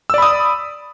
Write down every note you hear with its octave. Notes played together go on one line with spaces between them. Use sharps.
D5 B5 D#6 E6